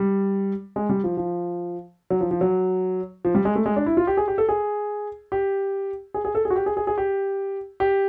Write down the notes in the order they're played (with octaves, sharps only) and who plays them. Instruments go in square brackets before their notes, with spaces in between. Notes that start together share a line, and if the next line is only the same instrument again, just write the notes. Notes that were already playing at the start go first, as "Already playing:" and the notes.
Already playing: [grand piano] G3
G#3
G3
F3
F3
F#3
F3
F3
F#3
F3
G3
G#3
A3
G#3
D4
E4
F4
G4
G#4
G4
A4
G#4
G4
G#4
G#4
A4
G#4
F#4
G4
G#4
G#4
G#4
G4
G4